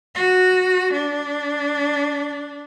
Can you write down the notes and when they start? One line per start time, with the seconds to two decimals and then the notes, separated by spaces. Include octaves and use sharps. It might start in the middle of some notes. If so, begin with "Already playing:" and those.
0.15 F#4
0.93 D4